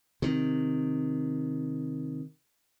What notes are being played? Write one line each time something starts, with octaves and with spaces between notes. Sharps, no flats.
C3 D#3